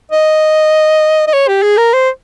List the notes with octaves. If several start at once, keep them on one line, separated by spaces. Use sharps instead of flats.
D#5
D#5
C#5
G4
G#4
A#4
C5